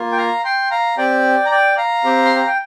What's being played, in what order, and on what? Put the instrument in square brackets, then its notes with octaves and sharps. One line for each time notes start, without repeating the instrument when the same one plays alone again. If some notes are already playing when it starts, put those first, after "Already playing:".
Already playing: [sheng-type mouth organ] A#3 F4
G5
F5 A#5
G5 C6
F5 A#5
C4 G4 D5 G5
A#5
D5 G5
F5 A#5
C4 G4
C6
A#5
G5